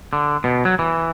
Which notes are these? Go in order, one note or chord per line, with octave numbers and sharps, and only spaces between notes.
D3
B2
F#3
E3